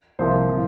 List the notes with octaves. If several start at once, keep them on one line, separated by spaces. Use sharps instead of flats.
C2 C3 F3 A#3 C5
A2 F3